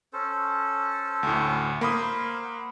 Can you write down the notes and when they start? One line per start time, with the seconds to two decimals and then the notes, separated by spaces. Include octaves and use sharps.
0.13 C#4 A4 C5
1.23 D2 A2
1.81 A#3 C5 F5 B5 D#6
2.44 F#5